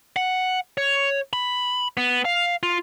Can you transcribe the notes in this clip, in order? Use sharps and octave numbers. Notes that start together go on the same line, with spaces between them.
F#5
C#5
B5
B3
F5
F4